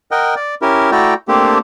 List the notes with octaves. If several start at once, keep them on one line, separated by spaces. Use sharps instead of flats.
A#4 D#5 F#5 G5
D5
C#4 E4 G4 A#4
A3 E4 F#4 D5 G5 A#5
A3 A#3 C4 D4 G4